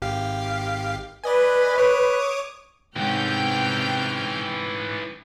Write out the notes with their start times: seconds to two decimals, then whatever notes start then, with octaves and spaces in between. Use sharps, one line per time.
0.02 G#1 G4 F5
1.24 B4 D5 D#5 G#5
1.78 C#5 D6 D#6
2.96 D#2 G#2 C3 E3 C#4 G5 F6 G6